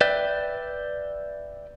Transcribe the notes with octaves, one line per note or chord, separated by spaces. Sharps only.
B4 D5 E5 G5